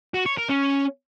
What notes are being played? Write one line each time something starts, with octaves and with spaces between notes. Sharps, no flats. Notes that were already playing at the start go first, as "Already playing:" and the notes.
F#4
C#5
A#4
C#4